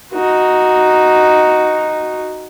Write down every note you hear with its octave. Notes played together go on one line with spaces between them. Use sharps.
D#4 F#4